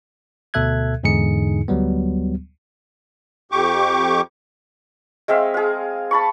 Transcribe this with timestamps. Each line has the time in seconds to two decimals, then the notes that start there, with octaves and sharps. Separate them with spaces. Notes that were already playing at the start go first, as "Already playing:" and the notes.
0.54 D2 B2 A4 E5 F#6 G#6
1.03 E2 G#2 D3 D#4 G#4 C#7
1.68 D2 F#3 G3 B3
3.52 F2 G4 C#6 D6
5.28 G#3 C4 E5 F5
5.54 G#4 F5
6.11 A5 B5 C#6